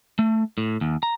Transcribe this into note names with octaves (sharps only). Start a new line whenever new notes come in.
A3
A2
D#2
A#5